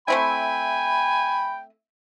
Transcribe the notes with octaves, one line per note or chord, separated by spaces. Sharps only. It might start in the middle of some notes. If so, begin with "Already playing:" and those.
A3 C4 E4 G5 G#5 B5